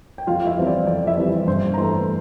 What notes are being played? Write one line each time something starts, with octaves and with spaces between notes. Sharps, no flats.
G5
F2 F4 F5
F5
E4 E5
E3 G3 C4 E4
D5
F2 D5
E4 E5
E3 G3 C4 E4
G2 C5 C6
A#5
E3 A3 C5 C6